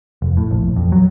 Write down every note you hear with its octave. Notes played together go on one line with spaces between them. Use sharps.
F1
A2
A#1
F2
F#3